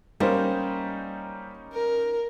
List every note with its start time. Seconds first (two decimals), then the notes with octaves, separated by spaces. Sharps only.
0.20 G3 A#3 C#4 D#4 C5
1.73 A#4